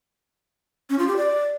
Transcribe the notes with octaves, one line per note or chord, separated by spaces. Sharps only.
C#4
F4
G4
D5